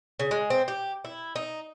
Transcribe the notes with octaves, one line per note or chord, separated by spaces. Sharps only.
C#3
G#3
C4
G4
E4
D#4